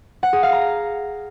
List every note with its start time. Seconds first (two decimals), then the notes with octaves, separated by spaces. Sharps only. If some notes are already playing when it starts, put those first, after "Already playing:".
0.23 F#5
0.33 G#4
0.43 F5
0.53 A#5